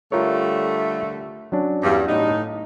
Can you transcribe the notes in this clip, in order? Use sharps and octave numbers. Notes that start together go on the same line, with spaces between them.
D3 G3 A3 F4 A#4 C#5
F#3 C#4 D4
E2 G2
A2 D#4